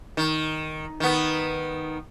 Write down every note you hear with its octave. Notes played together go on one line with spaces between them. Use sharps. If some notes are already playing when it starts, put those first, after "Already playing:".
D#3
D#3 B3